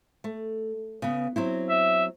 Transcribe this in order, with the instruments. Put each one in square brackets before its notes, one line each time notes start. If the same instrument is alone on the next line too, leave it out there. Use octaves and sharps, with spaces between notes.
[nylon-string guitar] A3
C#3 B3
F#3 C4 E4
[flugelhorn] E5